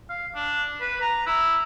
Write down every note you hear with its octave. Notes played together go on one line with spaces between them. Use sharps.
F5
D4
B4
A#5
E4